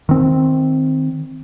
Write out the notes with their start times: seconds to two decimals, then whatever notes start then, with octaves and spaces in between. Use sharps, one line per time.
0.09 D#3 C4